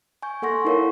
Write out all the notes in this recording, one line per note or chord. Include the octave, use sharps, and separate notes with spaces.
G#5 C#6 G6
A#3 A4 F#5 C6 C#6 A#6
D#4 E4 A#4 C#5 F5